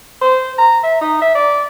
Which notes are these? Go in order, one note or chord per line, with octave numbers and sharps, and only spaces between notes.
C5
A#5
E5
D#4
E5
D5